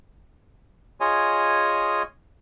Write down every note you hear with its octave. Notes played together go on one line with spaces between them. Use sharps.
F4 G#4 C#5 D#5 G#5